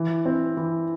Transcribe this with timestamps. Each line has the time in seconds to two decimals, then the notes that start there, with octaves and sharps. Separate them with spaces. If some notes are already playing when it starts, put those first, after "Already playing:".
Already playing: E3
0.25 C4
0.57 E3